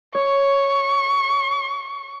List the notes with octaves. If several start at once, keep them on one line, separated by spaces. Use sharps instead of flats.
C#5 C#6